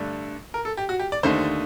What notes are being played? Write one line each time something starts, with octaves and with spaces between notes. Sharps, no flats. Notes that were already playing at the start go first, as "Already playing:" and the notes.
Already playing: G2 D3 A3 D4
A#4
A4
G4
F#4
G4
D5
D#2 D3 A3 D#4 C5